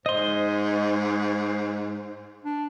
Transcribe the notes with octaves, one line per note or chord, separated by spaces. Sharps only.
G#2 C5 D#5 C6
D4